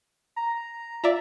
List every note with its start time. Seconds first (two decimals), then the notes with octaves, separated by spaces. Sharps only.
0.36 A#5
1.04 F4 D5 E5 A#5